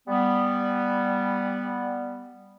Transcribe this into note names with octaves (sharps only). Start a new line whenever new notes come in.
G3 B3